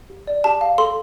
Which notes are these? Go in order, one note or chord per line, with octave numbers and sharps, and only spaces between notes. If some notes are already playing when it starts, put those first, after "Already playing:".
G4
D5
G4 A5
F5
A4 C6